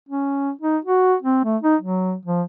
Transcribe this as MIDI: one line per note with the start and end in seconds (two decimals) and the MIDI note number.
0.09 0.51 61
0.61 0.77 63
0.85 1.15 66
1.22 1.43 60
1.44 1.57 57
1.62 1.76 63
1.81 2.15 54
2.25 2.43 53